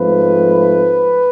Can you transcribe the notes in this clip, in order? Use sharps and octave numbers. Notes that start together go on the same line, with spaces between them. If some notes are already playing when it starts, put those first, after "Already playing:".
Already playing: G#2 F3 A3 C4 B4